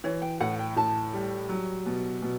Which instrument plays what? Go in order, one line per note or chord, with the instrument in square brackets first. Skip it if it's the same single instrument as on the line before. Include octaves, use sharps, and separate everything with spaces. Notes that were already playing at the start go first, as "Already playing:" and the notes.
[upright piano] E3 [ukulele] C#5
[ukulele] G5
[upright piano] A2 [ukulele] F#5
[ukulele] G5
[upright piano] A2 [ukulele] A5
[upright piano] G3
F#3
B2
B2